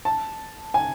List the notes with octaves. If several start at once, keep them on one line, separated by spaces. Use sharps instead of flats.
A5
G#5